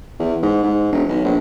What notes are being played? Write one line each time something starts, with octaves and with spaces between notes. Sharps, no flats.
E2
G#2
G#2
E1
B1
A#1